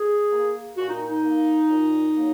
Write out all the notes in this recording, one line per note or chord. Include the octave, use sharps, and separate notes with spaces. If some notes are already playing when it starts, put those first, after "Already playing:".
Already playing: G#4
A#3
A#2 F#4
D#4
D#4
A#3
A#2
F#3 A#3